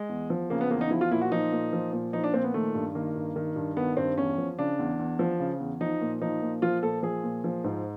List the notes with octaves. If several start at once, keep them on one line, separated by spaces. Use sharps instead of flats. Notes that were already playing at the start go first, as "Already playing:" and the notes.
Already playing: G#3
E2
F3
C#3 A#3
B3
E2 A#3
D#4
F3 E4
F4
A#2 E4
F#4
F3 D#4
A#2
F3
A#2
F3 D#4
D4
A#2 C4
B3
D#3 A3
G2
D#3 A#3
G2
D#3
G2
D#3 B3
G2 C4
E2 C#4
F3
C#3 D4
E2
E2
F3
C#3
E2
F3 D#4
A#2
F3 D#4
A#2
F3 F4
A#2 A4
F3 G#4
A#2
F3
G#2